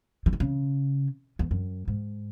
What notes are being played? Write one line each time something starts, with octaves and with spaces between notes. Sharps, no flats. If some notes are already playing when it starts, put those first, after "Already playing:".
E3
D#3
C#3
E2
F#2
G#2